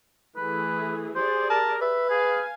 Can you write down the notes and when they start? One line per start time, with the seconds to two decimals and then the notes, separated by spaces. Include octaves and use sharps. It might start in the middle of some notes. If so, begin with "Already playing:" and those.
0.36 E3 A3 G#4 B4
1.16 G4 G#4 C5 D5
1.50 A#4 A5
1.81 B4 E5
2.10 G#4 F5 G#5